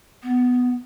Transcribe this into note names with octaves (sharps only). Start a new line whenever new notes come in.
B3